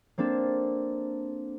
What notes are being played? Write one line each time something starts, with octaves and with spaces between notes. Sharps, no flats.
A#3 C4 D4 A4